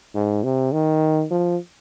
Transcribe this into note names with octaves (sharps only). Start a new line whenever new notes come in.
G#2
C3
D#3
F3